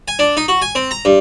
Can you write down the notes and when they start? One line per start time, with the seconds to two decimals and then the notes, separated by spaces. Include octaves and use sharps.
0.08 G#5
0.19 D4
0.37 D#4
0.48 F#4
0.62 G#5
0.75 C4
0.91 A#5
1.05 G2